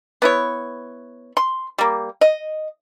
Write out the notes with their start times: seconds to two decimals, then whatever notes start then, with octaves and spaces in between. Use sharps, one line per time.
0.22 B3 E4 C#5
1.37 C6
1.78 G3 A#3
2.21 D#5